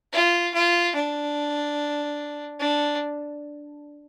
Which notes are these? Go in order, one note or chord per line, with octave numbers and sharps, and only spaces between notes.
F4
F4
D4
D4